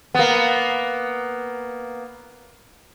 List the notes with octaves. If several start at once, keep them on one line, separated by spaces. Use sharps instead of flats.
A#3 B3